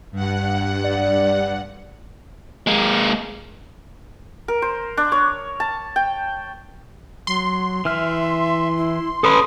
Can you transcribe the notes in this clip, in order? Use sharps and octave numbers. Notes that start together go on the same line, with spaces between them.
G2 F#5
D5
G#3 A#3
A#4
C5
D4
C#5
A5
G5
F#3 C6
E3 E5 F6
E4
C#4 A4 B4 D#6